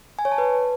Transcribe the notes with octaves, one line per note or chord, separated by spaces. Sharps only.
G#5
C#5
A5
B4